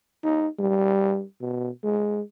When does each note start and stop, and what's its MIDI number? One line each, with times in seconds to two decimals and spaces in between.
0.24 0.48 63
0.59 1.24 55
1.41 1.70 47
1.83 2.21 56